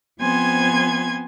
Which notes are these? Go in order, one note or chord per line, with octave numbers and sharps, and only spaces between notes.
F3 B3 C4 G#5 C6 G#6